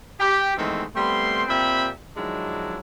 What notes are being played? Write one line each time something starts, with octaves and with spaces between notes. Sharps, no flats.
G4
D#3 E3 G#3 A3 B3 C4
G3 A3 B3 C4 C6
A#2 C4 G4 E5 G5 B5
D#3 F3 F#3 G#3 D4 E4